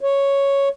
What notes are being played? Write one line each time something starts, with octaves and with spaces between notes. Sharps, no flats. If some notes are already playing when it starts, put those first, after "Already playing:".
C#5